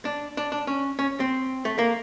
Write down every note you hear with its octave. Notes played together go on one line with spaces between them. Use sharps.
D4
D4
D4
C#4
C#4
C4
A3
A#3